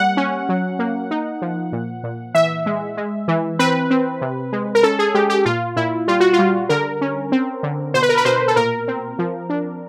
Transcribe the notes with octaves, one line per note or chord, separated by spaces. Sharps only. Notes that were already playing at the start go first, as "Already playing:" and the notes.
Already playing: G3 A#3 F#5
C#4
F#3
A#3
D#4
F3
A#2
A#2
E3 E5
G#3
G#3
E3
C4 B4
C4
C3
G#3
A#4
C#4 A4
G#4
G#3 G4
G4
A#2 F4
A#2 E4
G3 F4
F#4
F4
G3
D3 A#4
C#4
C4
D3
B2 C5
B4
A#4
B4
B2 C5
A4
A#2 A#4
C4
F3
D4